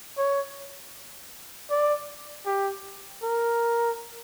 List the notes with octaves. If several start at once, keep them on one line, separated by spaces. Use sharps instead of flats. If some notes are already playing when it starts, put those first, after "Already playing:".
C#5
D5
G4
A#4